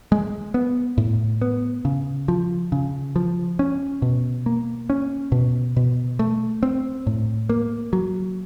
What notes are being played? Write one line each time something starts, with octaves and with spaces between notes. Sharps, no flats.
G#3
B3
A2
B3
C#3
F3
C#3
F3
C#4
B2
A#3
C#4
B2
B2
A3
C4
A2
A#3
F#3